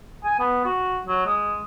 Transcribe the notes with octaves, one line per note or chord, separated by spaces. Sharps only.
G#5
B3
F#4
F#3
G#3